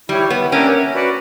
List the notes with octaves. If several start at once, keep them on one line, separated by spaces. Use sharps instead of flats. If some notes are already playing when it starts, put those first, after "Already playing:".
G3 E4 G4 C#5
B3
A#3 C#4 D4 A#4 E5 G5
F#4 B4 D5 F#5